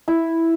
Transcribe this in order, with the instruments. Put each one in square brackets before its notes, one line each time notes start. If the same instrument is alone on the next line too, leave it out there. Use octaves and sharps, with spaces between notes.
[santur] E4